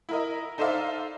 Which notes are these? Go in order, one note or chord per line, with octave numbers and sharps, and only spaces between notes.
E4 A#4 D#5
D#4 A4 C5 D5 E5 F5